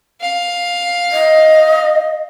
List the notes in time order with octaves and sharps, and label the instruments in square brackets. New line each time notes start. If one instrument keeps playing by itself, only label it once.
[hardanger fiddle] F5
[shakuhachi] D#5